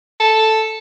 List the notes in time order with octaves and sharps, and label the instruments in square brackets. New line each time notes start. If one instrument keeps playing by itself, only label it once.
[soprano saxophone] A4